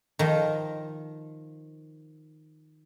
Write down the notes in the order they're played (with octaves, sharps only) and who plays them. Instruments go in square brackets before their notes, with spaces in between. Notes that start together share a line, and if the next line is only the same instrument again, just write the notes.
[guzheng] D#3 F3